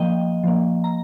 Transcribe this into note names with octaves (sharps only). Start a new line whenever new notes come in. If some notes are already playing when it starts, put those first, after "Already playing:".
Already playing: F3 A#3 D#5 G5
F3 A#3
A#5